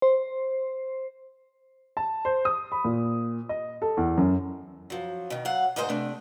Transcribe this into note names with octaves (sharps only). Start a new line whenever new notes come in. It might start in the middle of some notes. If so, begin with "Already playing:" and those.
C5
A5
C5
D#6
B5
A#2
D#5
A4
E2
F#2
F3 F#3
B2 D#3
F#3 F5 F#5
D2 G#2 D#4 C5 D#5
C3 A3 D4